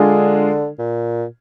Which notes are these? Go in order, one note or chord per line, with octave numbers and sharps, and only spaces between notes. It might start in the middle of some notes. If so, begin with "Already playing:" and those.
Already playing: D3 G#3 D4 F4 G#4
A#2